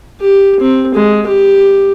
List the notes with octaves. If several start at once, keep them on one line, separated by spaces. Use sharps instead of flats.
G4
C4
G#3
G4